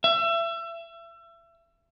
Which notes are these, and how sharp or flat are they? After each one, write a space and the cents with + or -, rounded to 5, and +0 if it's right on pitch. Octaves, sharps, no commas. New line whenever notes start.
E5 +30